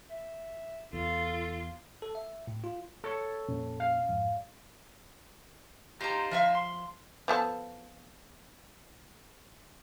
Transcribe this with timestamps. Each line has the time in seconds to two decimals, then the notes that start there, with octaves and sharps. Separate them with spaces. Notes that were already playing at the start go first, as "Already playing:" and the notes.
0.10 E5
0.93 E2 F4 A4
2.02 A4
2.15 E5
2.47 A2
2.64 F4
3.04 A4 C#5
3.48 F2 A#2 C#4
3.80 F5
4.09 F2 G#2
6.01 D#4 F4 G4 C5 A#5
6.31 F3 E5 F5
6.55 C6
7.28 F3 B3 A4